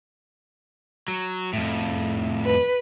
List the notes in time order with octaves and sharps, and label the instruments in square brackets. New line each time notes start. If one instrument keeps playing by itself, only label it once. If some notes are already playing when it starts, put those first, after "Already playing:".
[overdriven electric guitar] F#3
F2 A2
[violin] B4